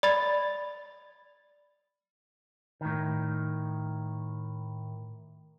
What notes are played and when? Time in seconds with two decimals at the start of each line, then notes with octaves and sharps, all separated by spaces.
0.03 D5 B5 A6
2.81 A2 D#3